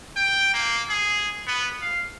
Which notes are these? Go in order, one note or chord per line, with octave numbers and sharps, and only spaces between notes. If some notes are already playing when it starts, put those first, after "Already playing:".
G5
A#3
G#4
B3
F5